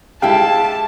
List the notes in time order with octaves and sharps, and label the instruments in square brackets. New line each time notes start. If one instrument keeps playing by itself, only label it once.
[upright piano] G#3 F5 G5 [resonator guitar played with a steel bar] E4 G4 A4 [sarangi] A5